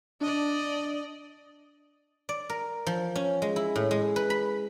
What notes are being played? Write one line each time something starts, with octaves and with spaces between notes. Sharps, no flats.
D4 D5 D#5
D5
A#4
F3
C#4
G#3
E4
A2
G#3
B4
B5